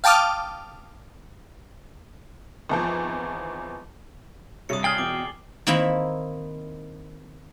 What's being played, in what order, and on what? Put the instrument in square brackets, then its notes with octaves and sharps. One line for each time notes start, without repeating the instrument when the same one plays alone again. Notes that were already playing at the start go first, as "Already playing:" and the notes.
[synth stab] F5 G5 A5 D6 D#6 F6
[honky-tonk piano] G#1 E2 F3
[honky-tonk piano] G2 C3 C#5 [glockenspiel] D#6 C#7
[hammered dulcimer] G#4 [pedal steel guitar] G5 F6 [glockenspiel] A6 F#7 G7
[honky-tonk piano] E2 B2 [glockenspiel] D6
[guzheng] D#3 A#3 C4 E4 B5